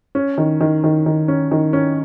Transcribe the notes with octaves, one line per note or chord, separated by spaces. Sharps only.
C#4
D#3
D#3
D#3
D#3
C#4
D#3
C#4